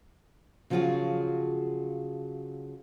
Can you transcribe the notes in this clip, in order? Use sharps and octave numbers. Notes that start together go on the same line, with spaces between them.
C#3 F3 F#3 F4 F#4 G#4